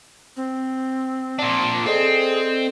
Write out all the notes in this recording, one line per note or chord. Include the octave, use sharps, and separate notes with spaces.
C4
A#2 D4
C4 G#4 A4 D5 D#5